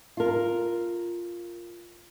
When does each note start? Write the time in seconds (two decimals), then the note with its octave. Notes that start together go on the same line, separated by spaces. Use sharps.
0.17 F4 A#4